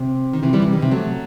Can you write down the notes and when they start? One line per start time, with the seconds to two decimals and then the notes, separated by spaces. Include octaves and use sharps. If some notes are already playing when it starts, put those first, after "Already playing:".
Already playing: C3
0.33 D#3
0.43 C3 E3
0.53 E3 G3
0.62 C3
0.73 D#3
0.82 C3
0.91 F#3 A3